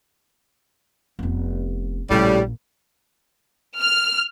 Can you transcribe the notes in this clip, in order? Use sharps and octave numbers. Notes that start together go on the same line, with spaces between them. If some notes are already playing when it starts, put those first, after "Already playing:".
F1 B3
A#1 A2 C#3 G3
F6